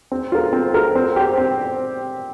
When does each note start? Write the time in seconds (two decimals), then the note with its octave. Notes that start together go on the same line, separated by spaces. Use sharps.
0.12 C4
0.32 F4 A#4
0.53 C4
0.74 F4 A#4
0.95 C4
1.16 G4 C5
1.38 C4